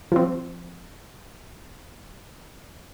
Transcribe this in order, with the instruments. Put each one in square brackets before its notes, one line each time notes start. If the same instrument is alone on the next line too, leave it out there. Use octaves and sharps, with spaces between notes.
[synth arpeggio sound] F3 C4